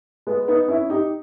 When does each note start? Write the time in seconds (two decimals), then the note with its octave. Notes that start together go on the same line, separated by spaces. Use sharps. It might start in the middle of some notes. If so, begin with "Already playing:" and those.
0.27 G#3 B3
0.48 B3 D#4
0.68 C#4 E4
0.90 D#4 G4